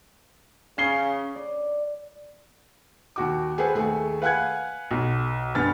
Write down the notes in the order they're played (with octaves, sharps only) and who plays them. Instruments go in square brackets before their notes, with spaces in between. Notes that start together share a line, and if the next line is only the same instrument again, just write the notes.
[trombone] C#3 [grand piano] C#4 C7 G7
[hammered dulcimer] D5
[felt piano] D#2 F#4 D6
G#4 A4 B4 C5 F#5
D#2 A3 G#4
B4 F5 F#5 G#5 F#6 G#6
B1
F1 G2 B3 G#5 F6 A6